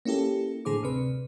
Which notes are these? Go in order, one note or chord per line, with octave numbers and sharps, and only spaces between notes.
A#3 C#4 E4 G4 A4
A2 D3 G#4 C5 D6
D2 C3 B4